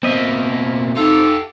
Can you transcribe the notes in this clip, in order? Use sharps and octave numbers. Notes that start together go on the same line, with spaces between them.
B2 A#3 C4 D#5 E5
D#4 F4 G4 A4